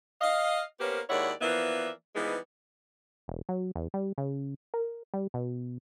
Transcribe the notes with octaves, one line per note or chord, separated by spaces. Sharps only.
D#5 F5
A#3 B3 C#4 G4 A#4 C5
D#2 G#3 E4 C#5 D5 F#5
E3 F3 A#3 B3 D5 E5
E3 F3 G3 G#3 B3 D#4
E1
F#3
E2
G3
C#3
A#4
G3
B2